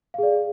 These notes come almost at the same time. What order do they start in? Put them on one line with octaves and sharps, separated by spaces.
F5 G#4 D5